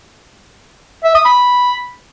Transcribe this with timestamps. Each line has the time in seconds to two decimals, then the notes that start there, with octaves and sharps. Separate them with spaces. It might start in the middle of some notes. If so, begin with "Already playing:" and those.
1.04 E5
1.15 D#6
1.25 B5